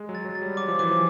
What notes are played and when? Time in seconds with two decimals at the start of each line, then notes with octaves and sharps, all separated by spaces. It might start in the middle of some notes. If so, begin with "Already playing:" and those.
Already playing: G#3
0.09 F#3
0.15 A6
0.25 F#3
0.35 A6
0.42 G3
0.57 F#3 D6
0.68 F3
0.79 E3 D6
0.91 F3